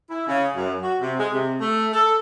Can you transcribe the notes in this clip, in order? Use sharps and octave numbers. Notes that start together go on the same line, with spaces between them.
E4
C#3
F#2
F#4
C3
G#3
C3
A3
A4